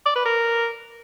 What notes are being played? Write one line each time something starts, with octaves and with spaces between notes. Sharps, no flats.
D5
B4
A#4